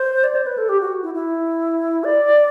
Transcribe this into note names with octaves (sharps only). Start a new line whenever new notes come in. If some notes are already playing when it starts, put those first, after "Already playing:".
Already playing: C5
D5
C5
B4
A4
G4
F#4
E4
E4
D5